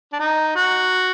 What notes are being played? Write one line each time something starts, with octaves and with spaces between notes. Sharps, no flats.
D4
D#4
F#4